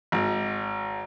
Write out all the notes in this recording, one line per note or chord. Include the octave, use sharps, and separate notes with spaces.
G#1